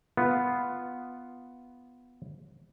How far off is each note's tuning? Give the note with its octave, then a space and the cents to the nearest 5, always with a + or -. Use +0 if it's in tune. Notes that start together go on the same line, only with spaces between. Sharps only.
B3 +0 F4 +0